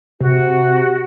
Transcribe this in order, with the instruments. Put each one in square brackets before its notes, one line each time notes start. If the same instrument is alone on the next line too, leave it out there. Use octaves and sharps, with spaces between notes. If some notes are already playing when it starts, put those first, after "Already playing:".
[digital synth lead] C3 [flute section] F#4